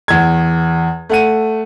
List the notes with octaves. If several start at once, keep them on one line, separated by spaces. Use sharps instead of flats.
E2 G#6
A3 F#5 D#7